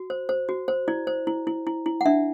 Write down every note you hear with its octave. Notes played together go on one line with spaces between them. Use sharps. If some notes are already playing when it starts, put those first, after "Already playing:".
Already playing: F#4
C5
C5
F#4
C5
E4 D5
C5
E4
E4
E4
E4
F#5
D4 E5